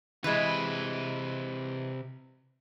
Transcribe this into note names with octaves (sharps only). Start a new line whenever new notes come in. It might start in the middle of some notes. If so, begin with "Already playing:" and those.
C3 E3 G#3 B4